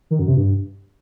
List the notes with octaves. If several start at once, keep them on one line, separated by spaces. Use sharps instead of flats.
D#3
F#2
C3
G2